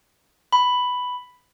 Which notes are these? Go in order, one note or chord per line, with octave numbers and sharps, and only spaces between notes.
B5